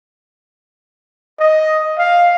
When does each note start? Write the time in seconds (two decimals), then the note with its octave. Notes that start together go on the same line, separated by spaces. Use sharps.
1.40 D#5
1.98 F5